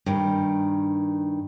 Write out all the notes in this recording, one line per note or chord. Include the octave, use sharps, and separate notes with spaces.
G2 D#3